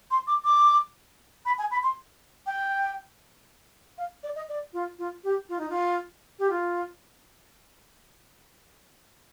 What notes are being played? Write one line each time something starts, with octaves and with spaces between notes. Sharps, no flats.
C6
D6
D6
B5
G#5
B5
C6
G5
F5
D5
D#5
D5
F4
F4
G4
F4
D#4
F4
G4
F4